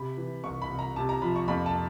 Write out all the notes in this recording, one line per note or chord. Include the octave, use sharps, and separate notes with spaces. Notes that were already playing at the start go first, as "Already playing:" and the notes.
Already playing: C3 B5
E3
C2 C#6
B5
C2
A#5
C3 A5
A#5
F3 B5
C#6
F2 B5
A5